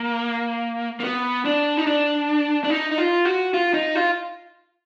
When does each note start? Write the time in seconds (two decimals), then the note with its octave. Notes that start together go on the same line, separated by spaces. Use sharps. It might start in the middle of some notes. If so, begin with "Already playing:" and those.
Already playing: A#3
1.00 A#3
1.04 B3
1.45 D4
1.77 D#4
1.87 D4
2.64 D4
2.70 D#4
2.91 D#4
2.98 F4
3.25 F#4
3.54 F4
3.74 D#4
3.95 F4